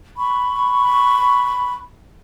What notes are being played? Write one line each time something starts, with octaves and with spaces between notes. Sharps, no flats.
B5 C#6